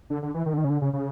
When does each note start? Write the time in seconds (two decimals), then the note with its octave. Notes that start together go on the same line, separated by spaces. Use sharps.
0.10 D3
0.22 D3
0.34 E3
0.46 D#3
0.53 D3
0.58 D#3
0.64 C#3
0.70 D3
0.82 C#3
0.93 C#3